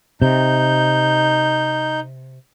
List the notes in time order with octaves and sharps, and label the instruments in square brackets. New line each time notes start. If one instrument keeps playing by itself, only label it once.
[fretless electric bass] C3 [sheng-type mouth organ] D#4 G6